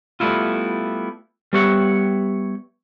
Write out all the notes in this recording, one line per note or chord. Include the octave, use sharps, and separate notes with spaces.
G3 A3 B3 E4 F4
G3 B3 G4 C#5 E5 F#5